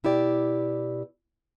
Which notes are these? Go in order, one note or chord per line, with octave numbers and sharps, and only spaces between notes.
B2 E4 G4 D5